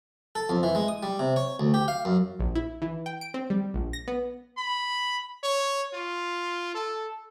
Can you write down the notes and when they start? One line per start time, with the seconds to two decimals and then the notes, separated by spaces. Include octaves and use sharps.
0.35 A4
0.49 F2
0.63 E3
0.75 G#3
0.88 D#6
1.03 G3
1.19 C3
1.36 C#5
1.60 D2
1.74 G4
1.88 F5
2.05 F#2
2.39 A#1
2.55 E4
2.82 E3
3.06 G5
3.21 D7
3.34 C4
3.50 G3
3.74 A#1
3.93 A#6
4.08 B3
4.58 B5
5.44 C#5
5.94 F4
6.74 A4